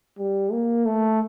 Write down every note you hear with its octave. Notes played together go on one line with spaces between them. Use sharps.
G3
A#3
A3